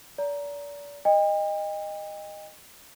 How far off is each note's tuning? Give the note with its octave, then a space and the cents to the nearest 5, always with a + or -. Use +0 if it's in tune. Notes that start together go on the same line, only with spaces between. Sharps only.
D5 -35 A#5 +0
D#5 -10 G5 +40